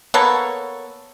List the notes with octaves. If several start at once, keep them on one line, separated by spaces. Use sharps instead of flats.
A#3 B3 A4 C#5